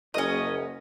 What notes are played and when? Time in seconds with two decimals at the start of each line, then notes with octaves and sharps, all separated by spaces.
0.14 F#1 C#4 D#5